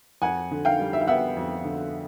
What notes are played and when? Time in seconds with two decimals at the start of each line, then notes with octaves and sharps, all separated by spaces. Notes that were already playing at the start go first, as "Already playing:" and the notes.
0.22 F2 F#5 G#5
0.51 D3
0.65 F5 G5
0.80 G3
0.93 E5
1.01 F5
1.08 B3 E5 F#5
1.37 F2
1.65 D3